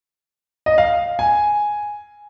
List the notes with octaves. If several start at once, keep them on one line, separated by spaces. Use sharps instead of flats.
D#5
F5
G#5